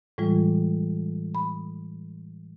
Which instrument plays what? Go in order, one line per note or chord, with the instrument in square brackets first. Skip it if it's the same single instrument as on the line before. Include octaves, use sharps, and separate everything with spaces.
[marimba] A2 E3 G3 G#3 F4
B5